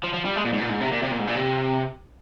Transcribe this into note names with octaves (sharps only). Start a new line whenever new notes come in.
F3
F3
G3
G#3
A#2
G#2
A#2
G#2
C3
A#2
C3
A#2
G#2
A#2
C3